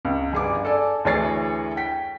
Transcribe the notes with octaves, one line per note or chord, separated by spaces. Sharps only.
C#2
G1 G#4 D6
A4 D5 G#5
D2 E3 G#4 C#5 A6 C7
G5 B6